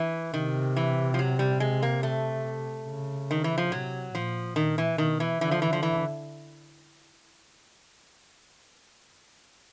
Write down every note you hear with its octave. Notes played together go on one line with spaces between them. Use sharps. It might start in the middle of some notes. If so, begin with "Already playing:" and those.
Already playing: E3
C3 D#3
E3
F3
F#3
G3
G#3
A#3
A3
C#3
D#3
E3
F3
C3 F#3
A#2 F3
A#2 D#3
E3
B2 D#3
E3
D3 E3
F3
E3
D3 F3
E3